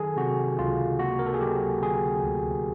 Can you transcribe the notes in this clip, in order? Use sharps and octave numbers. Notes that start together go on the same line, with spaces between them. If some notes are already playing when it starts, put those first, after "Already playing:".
Already playing: D#3 F#3 G#4 A4
C3 F#4
C#2 F4
A#3 F#4
A#4
A4
G#4
F#3 G4
D3 G#4
D2